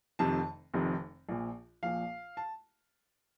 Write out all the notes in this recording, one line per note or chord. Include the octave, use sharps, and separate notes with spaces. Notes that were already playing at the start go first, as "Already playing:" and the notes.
F1 F2 C3 D#3 A5
F1 F2 C3 D#3
A#1 A#2 F3
A#1 A#2 F3 F5
A5